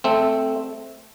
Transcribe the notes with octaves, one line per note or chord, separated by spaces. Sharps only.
A3 C4